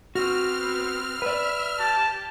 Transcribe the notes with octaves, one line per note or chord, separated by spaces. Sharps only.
B3 C4 F#4 F6
B4 D5 E5
G4 A5